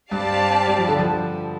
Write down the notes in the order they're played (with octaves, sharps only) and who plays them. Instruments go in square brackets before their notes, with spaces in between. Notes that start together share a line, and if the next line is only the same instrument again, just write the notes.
[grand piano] G2 [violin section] C4 G4 D5 F5 A5
[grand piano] G3
F3
D3
F3